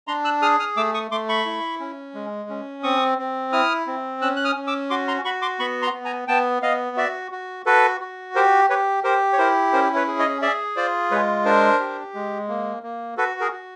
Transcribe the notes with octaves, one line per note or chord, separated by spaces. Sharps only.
D4 A#5 C6
E6 F#6
G#4 D#6 F6
D#6 F6
A3 D6 E6
C#6 D#6
A3 C6 D6
B5 C#6
E4
C#4
G#3
C#4
C4 C#6 D#6
C4
E4 D#6 F6
C4
C#4 E6 F#6
F#6
D#6 F6
C#4
D6 E6
F#4 C6 D6
A#5 C6
F#4 B5 C#6
C6 D6
B3 B5 C#6
A#5 C6
B3
G#5 A#5
B3 G5 A5
B3 D#5 F5
F#4 D5 E5
F#4
F#4 A4 B4
F#4
G4 A#4 C5
G4 B4 C#5
G4 A#4 C5
C#5
E4 A#4 C5
C#4 A#4 C5
B4 C#5
G#4
C#5 D#5
G#4 D5 E5
F4 C5 D5
G#3 B4 C#5
D4 A#4 C5
G4
G#3
A#3
A#3
F#4 A4 B4
G#4 A#4
F#4